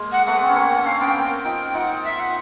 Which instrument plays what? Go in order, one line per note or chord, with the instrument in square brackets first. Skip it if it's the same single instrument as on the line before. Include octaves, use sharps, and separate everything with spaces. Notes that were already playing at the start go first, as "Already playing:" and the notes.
Already playing: [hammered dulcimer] G#3 A#3
[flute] F#5
[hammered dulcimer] A3 B3 [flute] F#5
[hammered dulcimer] C4
C#4
A#3 C4
C#4
[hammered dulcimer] C4 D4 [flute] F5
[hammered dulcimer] B3 C#4 [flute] G5
[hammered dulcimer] A#3 C4
D#4 F4
[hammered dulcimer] D#4 F4 [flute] F#5
[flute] E5
F#5